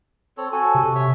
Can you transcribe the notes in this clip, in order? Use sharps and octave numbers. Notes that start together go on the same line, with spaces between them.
C4 A4 C#5
F#4 A4 G#5
C3
C#5 E5